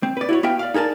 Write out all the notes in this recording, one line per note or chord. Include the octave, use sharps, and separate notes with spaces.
C4
B4 D5
E4 F#4 C#5
B3 F#4 E5 F5 G5
D5 F5
D#4 G#4 A#4 D5 A5